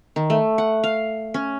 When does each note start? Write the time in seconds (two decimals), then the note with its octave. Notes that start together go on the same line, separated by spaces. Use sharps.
0.16 D#3
0.30 A3
0.58 F#5
0.84 F5
1.34 C#4